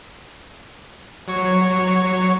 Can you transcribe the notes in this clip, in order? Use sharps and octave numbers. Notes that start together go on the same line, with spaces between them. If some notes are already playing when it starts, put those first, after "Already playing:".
F#3 C#5 C#6